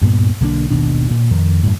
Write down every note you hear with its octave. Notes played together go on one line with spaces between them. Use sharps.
D2 G2 A#2 B3
B1 D3 A#3 D4
G#1 D#2 B2 D4
A#2
F2 D#3
F#2 A2